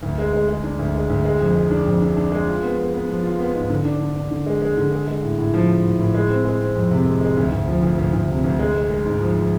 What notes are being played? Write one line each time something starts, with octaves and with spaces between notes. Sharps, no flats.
D2
G#3
G#3
G#3
D4
D2
G#3
D2
G#3
F2
G#3
D4
F2
D4
D4
G#3
F4
B3
B3
B3
F3
F4
B3
G#2
D3
D4
D3
D4
D3
G#3
G#3
D3
G#3
G#3
A2
A2
F3
F3
A2
A2
G#3
C4
G#3
C4
F2
C3
G#3
G#3
D2
D2
F3
D2
D2
D2
C3
D2
G#3
G#3
G#3
G#2
F3
F3